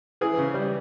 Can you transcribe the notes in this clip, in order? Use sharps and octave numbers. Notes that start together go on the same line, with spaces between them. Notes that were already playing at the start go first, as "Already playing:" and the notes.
E3 G#4
C#3
G3